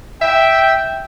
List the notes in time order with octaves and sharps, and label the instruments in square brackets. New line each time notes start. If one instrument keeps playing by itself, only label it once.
[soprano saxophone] E5 [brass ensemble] G5